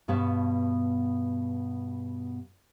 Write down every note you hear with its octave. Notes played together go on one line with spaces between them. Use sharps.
G2 B2 B3 C#5 F5 A5